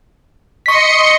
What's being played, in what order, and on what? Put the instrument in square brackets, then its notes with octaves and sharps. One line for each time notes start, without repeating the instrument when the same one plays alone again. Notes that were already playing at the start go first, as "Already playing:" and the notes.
[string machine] D#5 C6 C#7 [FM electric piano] C#6 B6